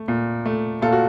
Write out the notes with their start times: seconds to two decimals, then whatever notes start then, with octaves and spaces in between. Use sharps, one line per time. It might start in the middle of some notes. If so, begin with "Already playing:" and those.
Already playing: A3
0.08 A#2
0.46 A3
0.82 A#2 F4 A4
0.92 F#4